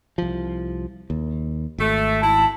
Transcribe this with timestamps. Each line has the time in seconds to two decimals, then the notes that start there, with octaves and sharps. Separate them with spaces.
0.18 C2 F3
1.10 D#2
1.78 G#1 A3
2.22 E4 A5